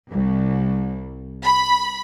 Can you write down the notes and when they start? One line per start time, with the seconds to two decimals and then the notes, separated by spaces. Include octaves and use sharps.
0.10 C2
1.43 B5